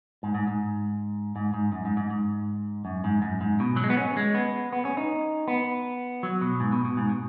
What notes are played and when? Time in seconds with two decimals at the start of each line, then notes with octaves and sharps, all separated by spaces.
0.23 G#2
0.35 G#2
0.47 G#2
1.36 G#2
1.54 G#2
1.72 F#2
1.85 G#2
1.97 G#2
2.11 G#2
2.85 F#2
3.04 G#2
3.22 F#2
3.41 G#2
3.60 B2
3.76 F#3
3.84 G#3
3.90 B3
3.97 C#4
4.17 G#3
4.35 B3
4.73 B3
4.85 C#4
4.97 D#4
5.48 B3
6.23 F#3
6.41 B2
6.60 G#2
6.72 B2
6.85 B2
6.97 G#2
7.09 B2